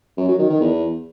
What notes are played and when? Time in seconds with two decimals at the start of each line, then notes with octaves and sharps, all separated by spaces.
0.17 F#2
0.28 F#3
0.39 D#3
0.50 D#3
0.61 E2